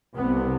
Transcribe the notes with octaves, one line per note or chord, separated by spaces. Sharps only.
C2 C3 B3